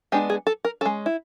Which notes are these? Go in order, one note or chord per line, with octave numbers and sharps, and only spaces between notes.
G#3 B3 D4 G4
G#4
A4
A#4
G#3 C#4 A4
E4